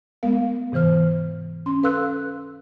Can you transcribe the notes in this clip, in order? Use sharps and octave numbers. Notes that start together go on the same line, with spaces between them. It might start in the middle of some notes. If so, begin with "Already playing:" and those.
G#3 A3 B3 A#4 F5
G#2 C3 E3 C5 F6
C#4 C6
A4 B4 F5 C6 E6 F#6